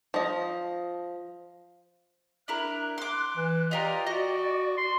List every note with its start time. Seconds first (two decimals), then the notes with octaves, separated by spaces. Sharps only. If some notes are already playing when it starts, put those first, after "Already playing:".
0.14 F3 D#5
2.48 D4 E4 A#4 F#6
2.98 C6 D6
3.36 E3
3.71 F4 G4 A#4 D5 D#5
4.07 F#4 D#5
4.77 C6